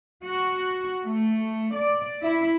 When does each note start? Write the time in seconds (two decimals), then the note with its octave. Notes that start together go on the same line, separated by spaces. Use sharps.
0.24 F#4
1.04 A3
1.75 D5
2.22 E4